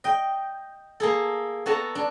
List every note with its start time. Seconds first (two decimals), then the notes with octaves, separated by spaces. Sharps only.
0.04 D#5 G5
1.00 A#3 G#4 A4
1.66 B3 F#4 A4 A5 A#5
1.95 D4